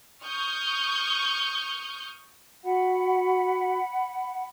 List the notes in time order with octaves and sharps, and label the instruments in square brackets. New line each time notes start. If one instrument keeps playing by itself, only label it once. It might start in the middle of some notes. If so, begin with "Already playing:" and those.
[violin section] C#6 D#6 F6 G6
[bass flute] F#4 [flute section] F#5 B5